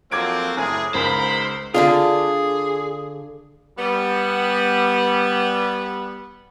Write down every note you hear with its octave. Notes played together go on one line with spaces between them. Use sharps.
F2 F#3 A#3 C4 D6 G#6 D7
F#1 A2 G#4
C#2 G#2 A#4 C5 B5
D3 D4 F4 G#4
G3 B3